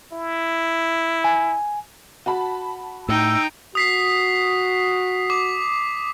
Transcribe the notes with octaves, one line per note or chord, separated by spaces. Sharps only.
E4
G#5
F#4 A5 B5
A2 D#4 G5 E6
F#4 D#6 B6 C7
D6